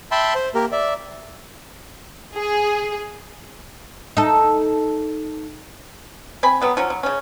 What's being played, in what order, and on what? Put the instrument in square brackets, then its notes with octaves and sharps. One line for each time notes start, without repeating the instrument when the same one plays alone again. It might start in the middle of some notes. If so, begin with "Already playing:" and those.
[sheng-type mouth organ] E5 G5 A5 B5 C6
C5
A#3 G4 A#4
D5 E5
[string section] G#4
[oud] D#4 A4
[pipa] C4 G#5 B5
F#3 G3 B3
F3 F#3 C#4
F#3
C#3 C#4